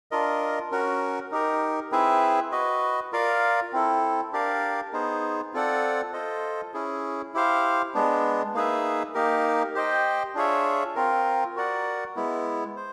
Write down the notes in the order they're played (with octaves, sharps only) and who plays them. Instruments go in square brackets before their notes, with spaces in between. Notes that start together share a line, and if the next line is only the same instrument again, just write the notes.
[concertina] D4 F4 A#4 D#5
C#4 F#4 A#4
D#4 G4 A#4
C4 E4 G#4 B4 E5
F#4 B4 D#5
F4 A#4 D5 F5
C4 E4 A4
D4 G4 A#4 D5 F5
B3 D#4 G#4 C5
C4 F4 A4 D5 F#5
F4 A4 C5 D#5
C#4 E4 G#4
E4 G4 C5 F5
G#3 B3 D4
A#3 D#4 G#4 B4 E5
A#3 D#4 G4 A#4
G4 C5 D#5 G5
D4 F4 G#4 C#5 E5
C4 F4 A#4
F#4 A#4 D5 F#5
G#3 B3 E4
C5